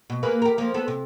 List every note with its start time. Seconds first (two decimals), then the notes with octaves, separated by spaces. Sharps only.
0.10 B2
0.23 A#3 G#4 B4
0.42 G4 A#4
0.58 F3 A#3
0.74 B3 A4
0.88 C3